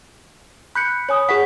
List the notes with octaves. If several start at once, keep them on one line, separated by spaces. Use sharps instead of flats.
B5 F#6 G6 C#7
C#5 G#5 D#6
G#4 C#5 F#5 B6